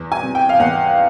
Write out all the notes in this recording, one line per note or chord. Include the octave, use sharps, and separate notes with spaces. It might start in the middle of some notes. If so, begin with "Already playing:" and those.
Already playing: E2
G#5
C3
G5
F5
E2 F#5